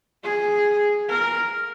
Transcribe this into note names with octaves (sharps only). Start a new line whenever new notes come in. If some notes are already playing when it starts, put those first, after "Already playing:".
G#4
A#4